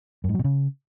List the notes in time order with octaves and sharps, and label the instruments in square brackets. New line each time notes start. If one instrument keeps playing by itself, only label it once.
[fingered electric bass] F#2
G#2
F#3
B2
C#3